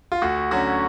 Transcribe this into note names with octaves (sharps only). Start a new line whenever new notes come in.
F4
D2 F#4
D3 F#3 C#4 F#4